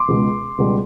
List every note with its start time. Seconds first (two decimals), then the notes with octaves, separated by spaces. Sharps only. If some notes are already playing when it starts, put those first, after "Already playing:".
Already playing: C6 D6
0.08 C#2 B2 G#3
0.58 C#2 B2 G3